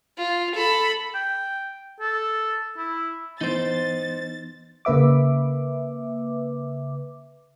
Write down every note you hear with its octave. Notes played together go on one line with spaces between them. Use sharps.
F4
A4 B5
G5
A4
E4
E3 B3 D#4 C5 C6 A6
C#3 A#3 B4 E5 D6